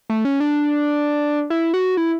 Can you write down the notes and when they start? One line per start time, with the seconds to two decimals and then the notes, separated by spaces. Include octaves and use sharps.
0.10 A3
0.25 C#4
0.40 D4
1.50 E4
1.74 F#4
1.97 E4